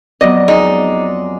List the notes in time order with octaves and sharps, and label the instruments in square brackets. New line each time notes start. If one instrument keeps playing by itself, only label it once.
[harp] F2 F#3 B3 [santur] D5 [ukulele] D#5
[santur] G#3 [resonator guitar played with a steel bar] D#4